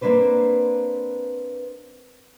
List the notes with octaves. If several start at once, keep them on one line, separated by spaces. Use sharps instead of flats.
A#3 C4 D4 B4 C5